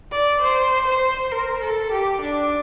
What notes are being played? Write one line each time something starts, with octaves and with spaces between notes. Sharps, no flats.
D5
C5
C5
A#4
A4
G4
D4